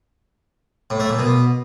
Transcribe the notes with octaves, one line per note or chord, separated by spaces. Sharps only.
A2
A3
A#2
B2